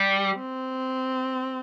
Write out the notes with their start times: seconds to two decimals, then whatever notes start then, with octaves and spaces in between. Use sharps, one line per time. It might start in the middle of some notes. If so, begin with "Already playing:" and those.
Already playing: G3
0.36 C4